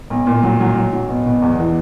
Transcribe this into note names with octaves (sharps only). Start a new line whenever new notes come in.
B1
A#2
F#3
F#3
F#3
F#3
B2
B2
E2
E3